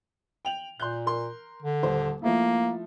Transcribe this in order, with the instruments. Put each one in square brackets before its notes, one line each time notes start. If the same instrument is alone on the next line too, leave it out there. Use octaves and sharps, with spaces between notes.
[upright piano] G5 F7 F#7
[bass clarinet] A#2 [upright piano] C6 F#6 G6
[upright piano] A#4 C6
[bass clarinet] D3
[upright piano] D#1 C5
[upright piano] F3 A3 E4 [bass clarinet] A#3